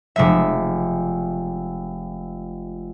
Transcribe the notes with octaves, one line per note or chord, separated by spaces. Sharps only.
F1 G#3 E5